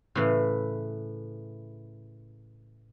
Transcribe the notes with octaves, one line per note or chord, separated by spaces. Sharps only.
A2 C#3 E3